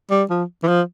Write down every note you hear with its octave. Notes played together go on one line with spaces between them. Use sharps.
G3
F3
E3
F3